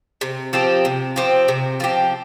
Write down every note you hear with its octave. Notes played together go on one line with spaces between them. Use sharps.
C3
F3 C4 G4
C3
F3 C4 G4
C3
F3 C4 G4